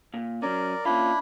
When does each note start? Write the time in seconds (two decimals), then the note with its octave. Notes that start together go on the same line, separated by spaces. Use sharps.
0.14 A#2
0.42 F#3 C#4 A#4 D5
0.85 A#3 C#4 D4 E4 F4 B5